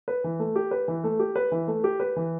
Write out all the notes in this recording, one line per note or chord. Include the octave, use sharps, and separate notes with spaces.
B4
E3
A3
G4
B4
E3
A3
G4
B4
E3
A3
G4
B4
E3